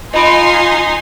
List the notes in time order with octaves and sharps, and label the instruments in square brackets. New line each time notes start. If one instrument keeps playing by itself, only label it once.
[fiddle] D#4 [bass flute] F4 [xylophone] D#5 B5 D7 [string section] G#5 C6